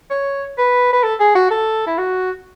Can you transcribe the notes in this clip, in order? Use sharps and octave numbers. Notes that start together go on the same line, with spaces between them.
C#5
B4
B4
A4
G#4
F#4
A4
E4
F#4